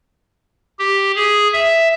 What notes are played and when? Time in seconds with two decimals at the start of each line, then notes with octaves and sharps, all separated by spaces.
0.79 G4
1.15 G#4
1.53 E5